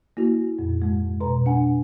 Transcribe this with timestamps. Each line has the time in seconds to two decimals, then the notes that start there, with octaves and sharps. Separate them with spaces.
0.17 A#3 E4 F#4
0.59 F2 A#2
0.82 G#2 G#3
1.21 B2 B4 A#5
1.46 D4 F#5 G#5